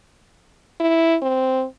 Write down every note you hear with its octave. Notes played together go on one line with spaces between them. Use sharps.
E4
C4